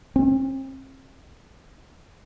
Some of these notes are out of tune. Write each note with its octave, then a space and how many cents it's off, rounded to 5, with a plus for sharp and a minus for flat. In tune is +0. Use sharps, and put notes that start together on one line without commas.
C4 +40